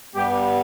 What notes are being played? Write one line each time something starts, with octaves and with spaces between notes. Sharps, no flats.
G2 G3 B3 G4